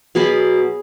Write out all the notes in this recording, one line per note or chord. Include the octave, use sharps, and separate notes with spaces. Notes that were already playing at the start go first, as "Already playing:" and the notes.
B2 F#3 B3 G#4 B4